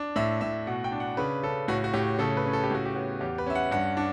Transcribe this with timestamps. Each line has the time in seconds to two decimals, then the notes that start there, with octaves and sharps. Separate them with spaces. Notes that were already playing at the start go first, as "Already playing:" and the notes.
Already playing: D4
0.16 A2 E5
0.41 A2 E5
0.67 B2 F#5
0.84 G5
0.92 D4
1.00 F#5
1.17 C#3 B4
1.43 C#3 A4
1.68 A2 F#4
1.84 F#4
1.93 A2 G4
2.19 C#3 A4
2.37 B4
2.45 C#4
2.53 A4
2.63 G4
2.71 A2 F#4
2.85 G4
2.95 B3
3.21 E2 G4
3.38 B4
3.47 C#4 E5
3.55 F#5
3.72 G2 F#5
3.97 D4